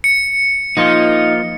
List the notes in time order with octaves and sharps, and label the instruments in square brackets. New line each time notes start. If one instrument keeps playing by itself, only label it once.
[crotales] C#7
[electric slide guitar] F3 A#3 F4 [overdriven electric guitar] D#4